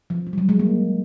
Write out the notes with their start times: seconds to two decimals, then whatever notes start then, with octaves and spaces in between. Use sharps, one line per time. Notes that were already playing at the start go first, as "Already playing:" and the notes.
0.10 F3
0.27 F3
0.33 G3
0.38 F#3
0.49 G#3
0.59 A#3